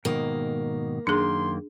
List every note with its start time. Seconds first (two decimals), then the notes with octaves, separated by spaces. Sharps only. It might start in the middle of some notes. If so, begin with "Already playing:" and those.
0.05 G#2 B2 D#3 A#3
1.07 F#2 D#3 A#3 D4 G#4 C6